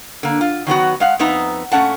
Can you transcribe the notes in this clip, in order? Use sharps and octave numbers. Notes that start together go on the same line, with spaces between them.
D3 A#3
F4
D#3 F#3 B3 F#4
G#3 F5 F#5
F2 B3 D#4 E5 A#5
A#2 A3 C#4 F#5 A5